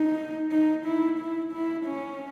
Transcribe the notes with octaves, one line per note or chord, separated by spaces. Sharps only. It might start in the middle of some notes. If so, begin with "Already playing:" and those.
Already playing: D#4
D#4
E4
E4
E4
C#4